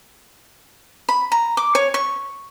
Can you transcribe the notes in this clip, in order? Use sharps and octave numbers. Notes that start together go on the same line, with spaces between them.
B5
A#5
D6
C#5
C#6